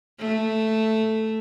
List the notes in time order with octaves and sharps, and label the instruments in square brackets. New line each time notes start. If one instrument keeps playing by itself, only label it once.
[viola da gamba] A3